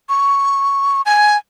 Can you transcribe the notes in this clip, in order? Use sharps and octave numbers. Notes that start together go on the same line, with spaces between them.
C#6
G#5